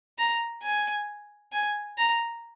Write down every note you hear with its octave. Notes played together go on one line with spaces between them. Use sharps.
A#5
G#5
G#5
A#5